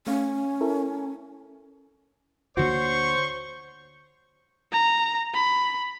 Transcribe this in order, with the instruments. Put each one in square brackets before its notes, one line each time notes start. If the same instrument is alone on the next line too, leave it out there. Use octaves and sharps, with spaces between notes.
[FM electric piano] A3 F5 [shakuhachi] C#4
[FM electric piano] E4 A4 A#4
[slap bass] D2 D3 A#3 [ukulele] F#4 [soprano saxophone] C5 [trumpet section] C#5 C6 C#6
[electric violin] A#5
B5